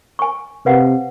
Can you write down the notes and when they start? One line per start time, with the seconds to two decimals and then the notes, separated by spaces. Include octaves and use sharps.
0.19 G#5 C#6
0.66 C3 B4 F5 F#5